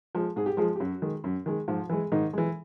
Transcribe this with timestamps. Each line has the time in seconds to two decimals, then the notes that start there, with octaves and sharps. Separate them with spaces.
0.15 F3 G#3
0.36 G#2 G#4
0.46 G4
0.57 F3 G#3 G#4
0.76 G4
0.80 F#2 F#3 F#4
1.02 D#3 G#3
1.24 F#2
1.46 D#3 G#3
1.68 G#2 F3 F4
1.90 E3 G#3
2.12 G#2 D#3 D#4
2.33 E3 G#3